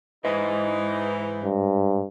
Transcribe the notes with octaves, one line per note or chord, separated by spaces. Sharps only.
G#2 E3 D#4 C5 D#5
G2